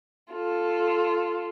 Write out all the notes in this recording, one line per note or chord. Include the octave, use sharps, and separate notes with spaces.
F4 A4